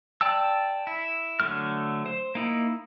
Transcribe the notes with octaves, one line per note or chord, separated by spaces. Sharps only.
D5 G5 A5 E6
E4
D3 F#3 A3 F6
C5
A#3 D#4 E4